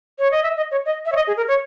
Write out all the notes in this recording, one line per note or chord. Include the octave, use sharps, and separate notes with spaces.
C#5
D#5
E5
D#5
C#5
D#5
E5
C#5
D#5
G#4
A#4
C#5